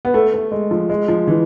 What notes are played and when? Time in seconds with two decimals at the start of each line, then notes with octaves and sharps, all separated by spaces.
0.05 B3
0.14 A3
0.34 A3
0.52 G#3
0.71 F3
0.89 G#3
1.08 F3
1.27 E3